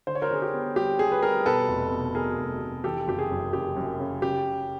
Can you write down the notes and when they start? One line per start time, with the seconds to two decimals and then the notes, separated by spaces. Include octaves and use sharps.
0.07 D3 C5
0.15 C#5
0.22 A#4 C5
0.31 D3 G#4
0.42 G4
0.53 B3
0.76 G3 G4
0.99 G3 G#4
1.12 B4
1.23 G3 G#4 A#4
1.46 B2 A4 B4
1.68 F1
1.92 B2
2.15 B2 G#4 A#4
2.38 F1
2.62 F1
2.84 E3 G4 A4
3.07 F#1 G4
3.19 G#4
3.31 F#2
3.53 F#1 G4
3.76 F#2
4.00 C#3
4.22 C#3 G4